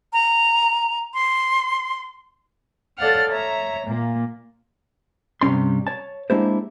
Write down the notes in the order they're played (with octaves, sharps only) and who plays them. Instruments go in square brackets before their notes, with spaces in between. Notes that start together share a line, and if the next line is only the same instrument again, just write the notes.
[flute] A#5
C6
[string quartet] A4 C#5 D5 F5 F#5 F6
C#5 E5 A#5
A#2 A#3
[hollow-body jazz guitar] G2 C3 G3 C#4 C6
C#5 A5
G#3 A#3 D4 E4 G4 C5